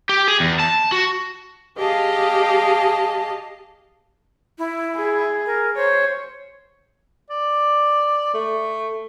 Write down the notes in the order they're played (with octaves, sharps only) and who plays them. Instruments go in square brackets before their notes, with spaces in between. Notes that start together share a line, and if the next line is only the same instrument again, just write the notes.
[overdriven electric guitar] G4
G#4
E2
A5
F#4
[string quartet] G4 G#4 D#5 F5 A5
[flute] E4
[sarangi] G#4
[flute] A#4
[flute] C5 [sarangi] C#5
[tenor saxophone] D5
A3